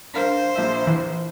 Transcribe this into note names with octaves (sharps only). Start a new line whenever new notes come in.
D4 A#4 C5 F5
A#1 E5
E3